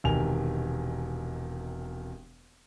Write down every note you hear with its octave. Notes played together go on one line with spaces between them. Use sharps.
E1 C3 D#3 G#5 F7